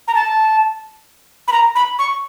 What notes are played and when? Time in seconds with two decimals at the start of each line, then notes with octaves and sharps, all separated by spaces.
0.08 A#5
0.15 A5
1.48 B5
1.52 A#5
1.75 B5
1.99 C#6